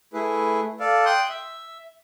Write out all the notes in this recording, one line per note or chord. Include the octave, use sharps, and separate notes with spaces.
A3 E4 G#4 B4
A4 D5 F5
G5 C6 D#6 F#6 G6
E5